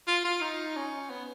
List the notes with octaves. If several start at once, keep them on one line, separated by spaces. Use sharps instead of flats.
F4
F4
D#4
C#4
B3